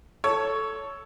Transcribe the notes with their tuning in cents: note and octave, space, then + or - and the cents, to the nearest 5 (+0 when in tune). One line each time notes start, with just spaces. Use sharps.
A4 +0 C#5 +10